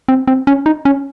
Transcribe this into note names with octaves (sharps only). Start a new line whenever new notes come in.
C4
C4
C#4
D#4
C#4